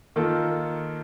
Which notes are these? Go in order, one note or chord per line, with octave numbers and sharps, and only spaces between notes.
D#3 A#3 F4 A4